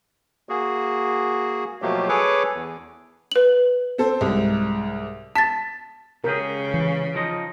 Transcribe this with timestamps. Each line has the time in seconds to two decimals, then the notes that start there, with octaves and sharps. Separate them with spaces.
0.49 A#3 F#4 G#4
1.82 B2 F3 F#3 A3 A#3 G4
2.09 G#4 A4 B4 C#5 G#5 D6
2.54 E2
3.31 B4 F#7
3.98 C4 A4 C5
4.21 C2 G#2
5.36 A5 A6 B6
6.24 C#2 C#3 G4 G#4 A#4
6.74 E3
7.15 F3 D#4 D#5